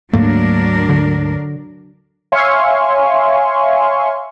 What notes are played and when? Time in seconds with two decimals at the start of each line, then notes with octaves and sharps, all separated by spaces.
0.13 D2 G#2 F#3 A3 A#3 D4 A#4
0.89 D3
2.32 C#5 E5 F5 G#5 C6 C#6